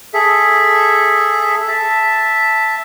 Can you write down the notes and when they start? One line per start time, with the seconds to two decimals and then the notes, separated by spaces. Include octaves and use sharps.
0.14 G#4 A4 E5
1.68 E5 A5